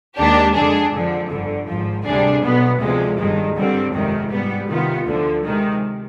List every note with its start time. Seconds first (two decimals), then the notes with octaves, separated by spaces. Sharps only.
0.16 D#2 D#3 G#3 D4 G4
0.53 F2 D3 G#3 D4 G#4
0.92 F2 D3 F3
1.29 G1 F2 D3
1.67 G#1 G#2 F3
2.05 D2 C3 G3 D4 G#4
2.42 B1 B2 B3
2.79 D2 C3 F3 G#3
3.17 G1 G2 D#3 G#3
3.55 G1 G2 D3 G3 C4
3.93 G1 F2 C3 D#3 G#3
4.30 G#2 G3 B3
4.69 C3 D#3 B3 F4
5.06 D2 D3 F3
5.43 C3 D#3 G#3